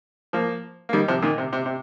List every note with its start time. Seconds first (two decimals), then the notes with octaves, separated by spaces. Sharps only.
0.33 F3 A#3
0.89 A#3
0.93 D#3 G3
1.08 C3 F3
1.22 A#2 D#3
1.38 C3
1.53 C3
1.66 C3